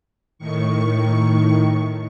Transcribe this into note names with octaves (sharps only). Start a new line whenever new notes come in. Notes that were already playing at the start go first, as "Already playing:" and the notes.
A2 D#3 C#6